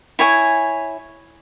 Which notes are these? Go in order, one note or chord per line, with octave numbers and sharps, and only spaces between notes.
E4 C#5 G#5